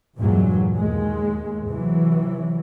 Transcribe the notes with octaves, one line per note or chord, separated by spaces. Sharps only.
E2 G2 A#2 E3 F#3 G#3
D#2 G#3
C3 E3 F#3